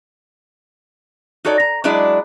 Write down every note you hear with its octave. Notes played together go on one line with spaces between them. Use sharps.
D#4 F#4 A4 C#5 D5
A#5
F#3 G#3 D4 E4 D5